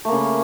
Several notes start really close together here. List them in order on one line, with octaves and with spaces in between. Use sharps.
A3 A#3 C#3